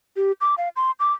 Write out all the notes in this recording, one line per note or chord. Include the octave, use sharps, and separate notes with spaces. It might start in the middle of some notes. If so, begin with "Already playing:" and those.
G4
D6
F5
C6
D6